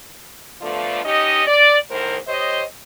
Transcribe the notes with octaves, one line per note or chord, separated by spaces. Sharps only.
D3 F3 A3 B3 F4 D5
C#4 D#4 G4 D#5
D5
E2 A2 D#3 A#4 C5
G4 C5 C#5 D#5